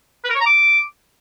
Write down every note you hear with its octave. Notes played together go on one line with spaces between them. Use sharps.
B4
A#4
C#5
A#5
D6